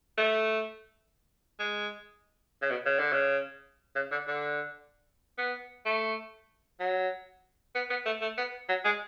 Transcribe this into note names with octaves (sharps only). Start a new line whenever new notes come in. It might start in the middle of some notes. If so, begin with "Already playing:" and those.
A3
G#3
C#3
B2
C#3
D3
C#3
C#3
D3
D3
B3
A3
F#3
B3
B3
A3
A3
B3
F#3
G#3